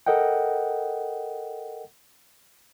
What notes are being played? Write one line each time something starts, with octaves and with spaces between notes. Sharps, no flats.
A4 A#4 D#5 F#5 G5